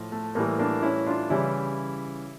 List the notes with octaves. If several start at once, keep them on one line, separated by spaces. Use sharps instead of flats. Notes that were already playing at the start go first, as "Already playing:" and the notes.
Already playing: A2 F3
A3
A2 E3 G3 A#3
A#3 D4
C#4 E4
D4 F4
C#3 E3 G3 C#4 E4